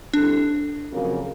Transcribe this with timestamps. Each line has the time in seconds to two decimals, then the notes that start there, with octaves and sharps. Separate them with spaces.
0.13 G3 C4 D4 E4 A4
0.91 F2 C#3 F#3 A#3